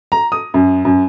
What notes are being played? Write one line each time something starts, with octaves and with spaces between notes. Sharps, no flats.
A#5
D#6
F#2
F#2